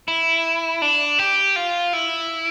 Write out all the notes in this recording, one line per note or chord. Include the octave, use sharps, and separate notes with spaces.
E4
D4
G4
F4
E4